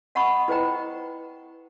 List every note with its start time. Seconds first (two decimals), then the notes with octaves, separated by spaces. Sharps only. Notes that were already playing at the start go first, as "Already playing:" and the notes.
0.15 D#5 F#5 A5 B5 C#6 D#6
0.48 E4 B4 C5 D#5 G5 A#5